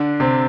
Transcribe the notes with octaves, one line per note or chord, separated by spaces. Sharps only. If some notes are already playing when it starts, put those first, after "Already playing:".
Already playing: D3 D4
C3 C4